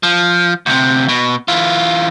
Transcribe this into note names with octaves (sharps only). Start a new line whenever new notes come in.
F3
D2 C3
B2
E3 F4